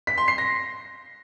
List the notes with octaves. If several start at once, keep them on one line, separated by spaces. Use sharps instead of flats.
B6
C6
C7
A#6